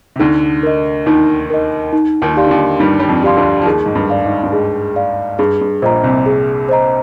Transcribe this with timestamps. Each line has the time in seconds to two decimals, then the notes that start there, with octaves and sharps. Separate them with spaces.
0.16 C3
0.19 D2 D3 D#4
0.63 A#4 D#5
1.06 D#2 D#3 D#4
1.50 A#4 D#5
1.93 D#4
2.22 D#2 D#3
2.37 G4 D5 F5 C6
2.47 D3
2.51 D#2 D#3
2.80 G2 G3 D#4
3.00 G3
3.08 F2 F3
3.23 G4 D5 F5 C6
3.37 D2 D3
3.62 F3
3.66 D#2 D#3 G#4
3.86 G#2
3.95 G2
4.10 D5 F5
4.24 G#2
4.43 G2
4.52 G#2 G#4
4.96 D5 F5
5.39 G2 G#4
5.61 G2
5.82 A#1 A#2 C5 D#5 A#5
6.04 C2 C3
6.26 G#4
6.69 C5 D#5 A#5